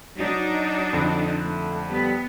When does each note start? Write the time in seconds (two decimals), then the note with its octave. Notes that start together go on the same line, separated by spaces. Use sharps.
0.18 F#3 D4 D#4
0.93 F2 D3
1.44 A3
1.89 G3 B3